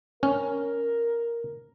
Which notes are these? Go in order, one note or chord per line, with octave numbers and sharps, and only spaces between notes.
C#4 A#4